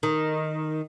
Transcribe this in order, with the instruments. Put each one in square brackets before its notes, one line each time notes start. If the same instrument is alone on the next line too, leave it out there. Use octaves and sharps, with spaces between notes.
[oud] D#3